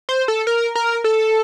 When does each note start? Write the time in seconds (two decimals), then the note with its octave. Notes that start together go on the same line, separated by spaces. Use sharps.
0.09 C5
0.28 A4
0.47 A#4
0.75 A#4
1.04 A4